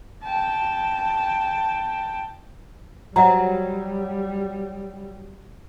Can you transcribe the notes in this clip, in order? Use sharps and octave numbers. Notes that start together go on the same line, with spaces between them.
G5 A5
F#3 G3 E5 F#5 A#5